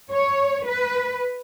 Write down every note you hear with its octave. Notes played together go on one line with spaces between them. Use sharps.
C#5
B4